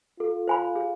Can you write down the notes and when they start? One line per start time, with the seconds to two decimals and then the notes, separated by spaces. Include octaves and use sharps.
0.20 F4 A4
0.48 C5 G#5 B5
0.76 G#4